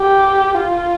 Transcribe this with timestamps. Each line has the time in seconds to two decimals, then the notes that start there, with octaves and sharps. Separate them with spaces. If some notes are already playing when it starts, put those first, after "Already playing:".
Already playing: G4
0.55 F4